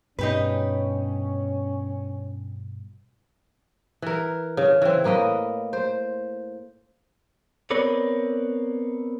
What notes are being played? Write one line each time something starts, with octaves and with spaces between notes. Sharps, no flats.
G2 B2 C#4 D#4 G4 B4
E3 A#4
C#3
E3 C4
A2 A#3 B4 D#5
C5
B3 C4 A#4 B4 C#5 D5